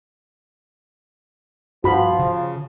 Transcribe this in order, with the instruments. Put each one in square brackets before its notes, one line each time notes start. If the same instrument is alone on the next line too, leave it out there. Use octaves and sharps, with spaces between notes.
[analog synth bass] G2 [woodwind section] F3 [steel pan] F#4 B5
[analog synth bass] C#3